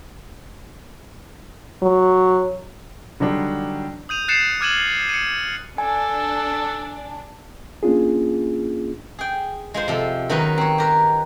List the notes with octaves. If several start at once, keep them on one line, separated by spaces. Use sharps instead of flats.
F#3
D3 F#3 G3 D4 D#4 G4
D#6 G6 D#7 F7
F#6 A6 C7 C#7 E7
D6 F6 G#6 D#7 E7 F#7
C#7 D#7
D4 A4 G#5
A#3 C#4 D4 F4 G#4
G#4 G5
G#3 F4 C5
C3 F3 A4
D#3 F#3 C#4 D#4 A#4 B4
C4 C#5
G4 A#4 B4